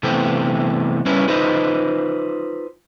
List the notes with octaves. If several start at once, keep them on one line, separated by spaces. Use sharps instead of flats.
C3 E3 A3 B3 C4 G4
G3 C#4 E4 A#4 B4 C#5
D#4 F4 B4 C5 D#5